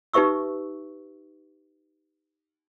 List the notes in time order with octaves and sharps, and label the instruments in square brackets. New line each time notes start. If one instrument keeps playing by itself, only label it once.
[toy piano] D#4 G4 B4 E5 C#6 E6